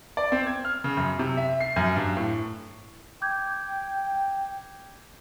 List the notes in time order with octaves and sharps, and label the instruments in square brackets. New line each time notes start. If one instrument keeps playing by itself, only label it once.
[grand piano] D5
C4
G#6
F6
C#3
F#2
C3
E5
C7
F#2
G2
A2
[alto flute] G5 [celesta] D6 G6 G#6